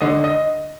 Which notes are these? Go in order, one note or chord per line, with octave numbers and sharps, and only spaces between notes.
D3 D#5
D#5